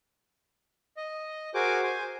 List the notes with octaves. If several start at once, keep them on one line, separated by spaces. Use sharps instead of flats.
D#5
F#4 G#4 A#4 C5 G#5 D6
C5 G#5